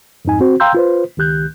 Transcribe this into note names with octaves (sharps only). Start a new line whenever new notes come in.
F2 G#2 D#4 G#5
C4 F#4 C5
F5 G5 A#5 C6 E6 G6
F4 B4 C5
C#2 D#3 G4 F#6 G6